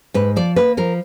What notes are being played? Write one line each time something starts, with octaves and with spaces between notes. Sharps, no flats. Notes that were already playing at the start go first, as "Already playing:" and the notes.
G#2 B4
F3 D5
A#3 B4
F3 A#4